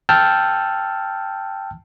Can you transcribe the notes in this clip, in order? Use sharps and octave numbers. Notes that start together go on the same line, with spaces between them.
G5 A5 E6 F6 G6